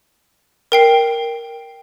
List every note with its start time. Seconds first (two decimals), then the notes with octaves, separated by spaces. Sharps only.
0.72 A#4 G5 C7